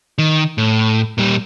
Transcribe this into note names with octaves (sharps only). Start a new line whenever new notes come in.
D#3
A2
A#2 G3